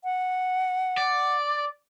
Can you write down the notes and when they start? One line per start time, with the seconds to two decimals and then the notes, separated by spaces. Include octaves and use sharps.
0.04 F#5
0.97 D5